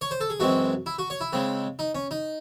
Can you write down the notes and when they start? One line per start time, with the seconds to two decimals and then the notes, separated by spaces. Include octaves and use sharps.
0.01 C#5
0.11 C5
0.21 A4
0.30 G#4
0.40 F#2 E3 G#3 C4 F#4
0.86 E4
0.98 F#4
1.10 C#5
1.21 E4
1.33 C#3 G#3 C4
1.79 D#4
1.95 C#4
2.11 D#4